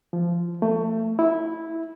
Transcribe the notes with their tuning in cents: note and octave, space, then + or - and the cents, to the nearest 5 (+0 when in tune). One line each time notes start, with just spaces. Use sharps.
F3 -15
A3 +25
E4 -10